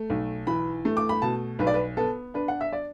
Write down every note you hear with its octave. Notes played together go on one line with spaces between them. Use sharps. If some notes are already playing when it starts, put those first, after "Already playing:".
Already playing: A3
B1
E3 B5
A3
D6
B5
B2 A5
B1 B4
D5
B4
B3 A4
D4 B4
F#5
E5
D5